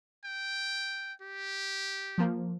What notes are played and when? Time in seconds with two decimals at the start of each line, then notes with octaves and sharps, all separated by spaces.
0.24 G5
1.21 G4
2.18 F3 A#3